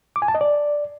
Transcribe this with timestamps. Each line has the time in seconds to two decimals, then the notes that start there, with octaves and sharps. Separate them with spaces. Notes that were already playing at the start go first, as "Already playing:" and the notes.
0.16 D6
0.22 G#5
0.28 A5
0.35 D#5
0.41 D5